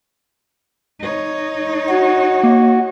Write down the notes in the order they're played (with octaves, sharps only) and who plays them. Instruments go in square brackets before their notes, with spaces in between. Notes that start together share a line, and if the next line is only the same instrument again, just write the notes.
[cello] D#4 C#5
[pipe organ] F#4
[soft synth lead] A#3